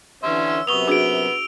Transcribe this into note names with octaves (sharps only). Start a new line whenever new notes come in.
D3 E3 C#4 E5 C6
E6
F#2 C3 B3 C#6 D#6 F7 G7
D4 F#4 G#4 E6 D7